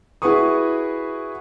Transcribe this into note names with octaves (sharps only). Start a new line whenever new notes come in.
E4 F#4 G#4 B4 C#6 D#6